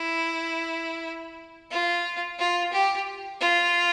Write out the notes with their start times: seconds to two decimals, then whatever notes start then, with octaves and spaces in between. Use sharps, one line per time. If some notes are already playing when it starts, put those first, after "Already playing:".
Already playing: E4
1.71 F4
2.39 F4
2.73 G4
3.41 F4